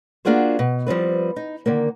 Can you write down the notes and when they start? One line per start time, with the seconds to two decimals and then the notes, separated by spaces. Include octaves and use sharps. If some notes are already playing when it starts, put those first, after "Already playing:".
0.25 A#3 D4 F4 F#4 G#4 C5
0.59 B2
0.87 F3 G3 C4 B4
1.36 D#4
1.66 D3 D#3 A#3